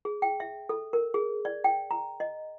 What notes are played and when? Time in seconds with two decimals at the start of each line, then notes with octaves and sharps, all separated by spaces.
0.05 G#4
0.22 G5
0.40 E5
0.69 A4
0.93 A#4
1.14 G#4
1.45 D5
1.64 G5
1.91 A#5
2.20 D#5